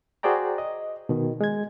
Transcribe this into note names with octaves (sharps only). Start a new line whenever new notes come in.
F#4 G#4 C5 D5 G5 A#5
D#5
B2 D#3
G#3 G#6